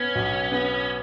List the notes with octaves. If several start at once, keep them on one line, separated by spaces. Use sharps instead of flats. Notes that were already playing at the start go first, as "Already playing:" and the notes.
Already playing: B3 C#4
B1
B3